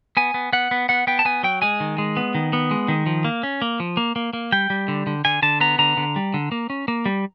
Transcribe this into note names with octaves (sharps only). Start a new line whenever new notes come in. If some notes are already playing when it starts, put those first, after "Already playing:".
B3 G#5
B3
B3 F#5
B3
B3 F#5
B3 G5
A5
B3 G#5
F#3 G5
G#3 G#5
D#3
G#3
B3
D#3
B3
G#3
D#3
F3
A#3
C#4
A#3
F3
A#3
A#3
A#3
G3 G5
G3
D3
D3
D3 G#5
D3 A5
B3 A#5
D3 A#5
D3
G3
D3
A#3
C#4
A#3
G3